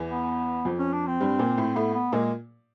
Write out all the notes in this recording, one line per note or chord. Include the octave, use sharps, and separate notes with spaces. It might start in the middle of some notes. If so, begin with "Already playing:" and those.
Already playing: E2 E3
B3
F2 F3
C#4
D4
C4
G2 G3
A#2 A#3
A2 A3
A2 A3 B3
B3
A#2 G#3 A#3